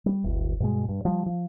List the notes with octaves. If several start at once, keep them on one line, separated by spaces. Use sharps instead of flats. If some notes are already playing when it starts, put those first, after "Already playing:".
G3
D1 G1
G2 B2 G#3
G2
F3 G3
F3